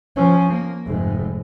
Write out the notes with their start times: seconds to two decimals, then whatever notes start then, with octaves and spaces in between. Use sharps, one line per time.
0.16 F3 C#4
0.52 A#3
0.86 F1 G#2